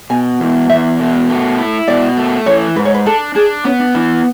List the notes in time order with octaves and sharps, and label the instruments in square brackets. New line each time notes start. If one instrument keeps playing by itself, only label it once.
[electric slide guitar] B2 [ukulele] G#5
[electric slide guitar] E2
[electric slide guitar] E2 [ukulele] E5
[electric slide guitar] B2
A3
E4
[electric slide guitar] B2 [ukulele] D5
[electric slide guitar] A3
[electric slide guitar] E3 [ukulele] C#5
[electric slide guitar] G#2 [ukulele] B4
[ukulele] C#5
B4
[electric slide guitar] D4 [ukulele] A4
[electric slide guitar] D4 [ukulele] G#4
[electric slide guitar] B3 [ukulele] C#4
[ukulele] D4
[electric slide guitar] E3 [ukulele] D4